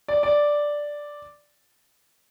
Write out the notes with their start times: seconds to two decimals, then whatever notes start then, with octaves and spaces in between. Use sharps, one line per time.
0.08 D5
0.23 D5